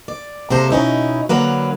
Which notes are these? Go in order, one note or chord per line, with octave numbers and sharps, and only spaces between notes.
D5
C3 G#3 A#3 A4 C5
B2 C#4 D#4 E4
D3 F#3 A#3 B4